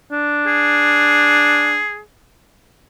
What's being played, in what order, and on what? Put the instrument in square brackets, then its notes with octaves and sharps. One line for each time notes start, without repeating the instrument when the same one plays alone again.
[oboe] D4
[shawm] G#4